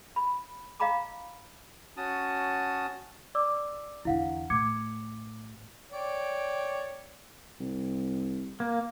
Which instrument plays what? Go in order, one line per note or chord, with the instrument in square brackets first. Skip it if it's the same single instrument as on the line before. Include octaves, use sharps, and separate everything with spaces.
[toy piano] B5
D#5 F5 G5 A#5 B5 D6
[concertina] C#4 F#4 A5 D#6
[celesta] D5 D6 E6
[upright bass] E2 D3 [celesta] E4 F5 F#5
[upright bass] A2 [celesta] D6 G#6 C#7
[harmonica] C#5 D5 G5
[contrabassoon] C2
[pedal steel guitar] A#3